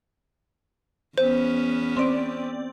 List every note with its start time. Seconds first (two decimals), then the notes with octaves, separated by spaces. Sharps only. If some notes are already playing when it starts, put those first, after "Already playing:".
1.18 E2 B3 C#4 C5
1.97 C4 D5